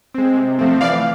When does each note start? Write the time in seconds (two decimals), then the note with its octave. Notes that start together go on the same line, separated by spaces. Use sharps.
0.14 G#3 C4
0.37 C3
0.59 F3 A3 C4
0.81 E3 D5 F5